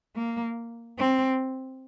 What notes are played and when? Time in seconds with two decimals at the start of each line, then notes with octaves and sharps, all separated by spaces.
0.16 A#3
0.99 C4